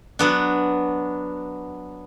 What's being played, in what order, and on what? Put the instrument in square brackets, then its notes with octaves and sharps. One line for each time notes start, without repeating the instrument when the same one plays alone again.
[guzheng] F#3 B3 D4